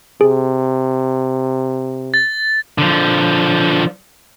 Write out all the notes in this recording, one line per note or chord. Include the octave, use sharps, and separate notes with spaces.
C3 G#4
A6
D3 F3